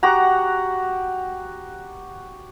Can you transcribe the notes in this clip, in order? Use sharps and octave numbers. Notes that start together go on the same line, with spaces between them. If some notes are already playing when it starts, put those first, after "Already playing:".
F#4 G4 F#5 A#5